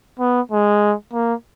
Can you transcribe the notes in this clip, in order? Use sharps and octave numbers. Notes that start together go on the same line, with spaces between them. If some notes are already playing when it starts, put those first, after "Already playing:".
B3
G#3
A#3